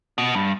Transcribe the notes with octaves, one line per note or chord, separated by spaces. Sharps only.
B2
G2